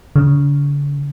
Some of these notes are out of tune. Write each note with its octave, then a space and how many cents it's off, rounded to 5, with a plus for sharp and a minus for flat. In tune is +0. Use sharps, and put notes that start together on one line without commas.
D3 -45